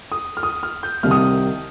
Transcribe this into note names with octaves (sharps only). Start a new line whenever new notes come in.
D#6
F6
D#6
F6
G6
C2 C3 D#3 F6
D#6